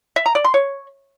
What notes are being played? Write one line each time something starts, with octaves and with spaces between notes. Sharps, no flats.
E5
A#5
D5
C6
C#5